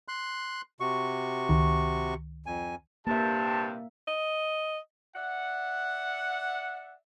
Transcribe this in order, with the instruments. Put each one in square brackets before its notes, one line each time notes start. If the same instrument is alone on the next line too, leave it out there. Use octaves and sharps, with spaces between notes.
[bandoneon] C6 F#6
C3 F#4 C#6
[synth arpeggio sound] C#2 D#3
[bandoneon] F2 G#5
[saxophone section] G2 C3 [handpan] A#3 E5 [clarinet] A5
[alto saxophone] D#5
[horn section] D5 E5 F#5